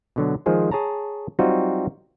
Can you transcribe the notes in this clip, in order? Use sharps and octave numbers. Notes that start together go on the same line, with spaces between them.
B2 D3 F#3
D#3 F3 G#3 G#4 C5
G#4 C#5 A5 A#5
F#3 G3 C4 D#4 F4 F#4